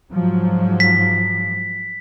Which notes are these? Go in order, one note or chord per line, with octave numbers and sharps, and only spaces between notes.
G#2 F3 F#3
B6